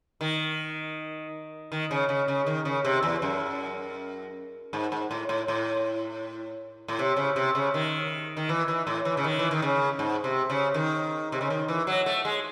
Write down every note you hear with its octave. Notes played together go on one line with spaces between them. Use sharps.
D#3
D#3
C#3
C#3
C#3
D#3
C#3
C3
E2
F#2
G#2
G#2
A2
A2
A2
A2
C3
C#3
C3
C#3
D#3
D#3
E3
E3
A2
E3
C#3
D#3
E3
D#3
C#3
G#2
C3
C#3
D#3
C3
C#3
D#3
E3
F#3
A3
G#3